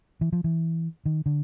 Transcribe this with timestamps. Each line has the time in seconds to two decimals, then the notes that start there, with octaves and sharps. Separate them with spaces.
0.21 E3
0.33 F3
0.44 E3
1.06 D#3
1.26 D3